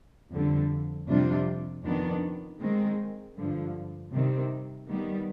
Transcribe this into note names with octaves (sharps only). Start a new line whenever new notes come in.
F2 D3 G3
F2 C3 G3 D4 F4
F2 D#3 B3 D4
D#3 G#3 C4
G2 D3 F3
C3 D#3 G3 C4
D#3 G3 B3